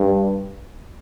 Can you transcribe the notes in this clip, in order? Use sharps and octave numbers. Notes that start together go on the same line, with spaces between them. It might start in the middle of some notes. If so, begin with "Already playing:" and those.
Already playing: G2